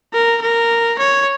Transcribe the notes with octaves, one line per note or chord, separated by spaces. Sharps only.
A#4
A#4
C#5